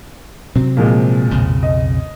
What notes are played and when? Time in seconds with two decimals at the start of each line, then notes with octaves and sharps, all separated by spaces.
0.56 C3 F#3 C4
0.77 A#2 F3 G#3
1.31 B1 F2 C#3
1.63 D#5